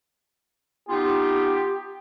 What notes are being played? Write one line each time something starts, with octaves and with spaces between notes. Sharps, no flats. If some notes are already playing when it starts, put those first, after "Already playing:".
B3 D#4 F4 G4